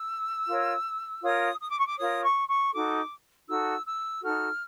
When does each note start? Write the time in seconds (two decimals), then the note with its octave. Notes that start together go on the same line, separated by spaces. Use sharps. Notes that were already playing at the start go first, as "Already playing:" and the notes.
Already playing: E6
0.47 F4 A#4 C#5
1.23 F4 A#4 C#5 D#6
1.60 D#6
1.69 D6
1.77 C#6
1.86 D6
1.98 F4 A#4 C#5 D#6
2.23 C#6
2.48 C#6
2.73 D#4 F#4 A4 D6
3.48 D#4 F#4 A4 E6
3.86 E6
4.23 D#4 F#4 A4 F6